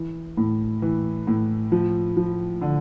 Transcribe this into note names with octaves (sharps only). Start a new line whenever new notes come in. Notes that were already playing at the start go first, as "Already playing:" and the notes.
Already playing: E3
A2
E3
A2
F3
F3
D3